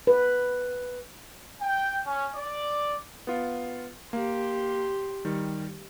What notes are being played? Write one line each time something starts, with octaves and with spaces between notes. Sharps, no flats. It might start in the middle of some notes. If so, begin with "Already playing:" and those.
B4
G5
C#4
D5
B3 F4
A#3 G4 C6
D#3 G3